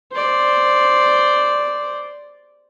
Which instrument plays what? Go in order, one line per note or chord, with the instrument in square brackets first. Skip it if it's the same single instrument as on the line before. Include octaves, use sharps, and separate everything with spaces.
[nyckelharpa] C5 D5